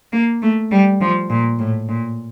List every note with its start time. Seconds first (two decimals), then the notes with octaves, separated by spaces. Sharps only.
0.13 A#3
0.42 A3
0.71 G3
1.01 F3
1.30 A#2
1.59 A2
1.88 A#2